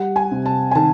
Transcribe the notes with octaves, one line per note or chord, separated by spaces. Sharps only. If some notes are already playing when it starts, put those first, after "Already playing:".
Already playing: G3 F#5
G#5
C3
A5
G#5
D#3 A5